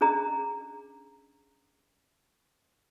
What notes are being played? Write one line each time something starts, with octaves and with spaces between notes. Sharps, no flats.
C#4 D4 G#4 D#5 A#5